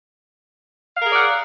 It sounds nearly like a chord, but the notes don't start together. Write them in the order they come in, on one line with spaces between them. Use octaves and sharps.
F5 A#4 G#4 D5 F#5